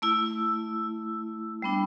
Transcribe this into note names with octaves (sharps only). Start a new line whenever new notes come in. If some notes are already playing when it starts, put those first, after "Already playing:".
A3 E4 E6
G3 B3 D4